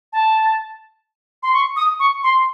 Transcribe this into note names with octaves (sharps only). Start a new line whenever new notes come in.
A5
C6
C#6
D#6
C#6
C6